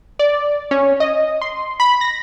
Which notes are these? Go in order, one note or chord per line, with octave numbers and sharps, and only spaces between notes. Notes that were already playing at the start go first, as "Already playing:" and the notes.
D5
C#4
D#5
C6
B5
A#6